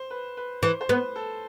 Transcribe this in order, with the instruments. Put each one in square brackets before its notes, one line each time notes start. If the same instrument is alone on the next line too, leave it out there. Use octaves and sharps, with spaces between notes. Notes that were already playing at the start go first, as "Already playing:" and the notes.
Already playing: [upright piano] C5
B4
B4
[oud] E3 [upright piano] C5
[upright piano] C5
[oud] B3 [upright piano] B4
[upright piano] A4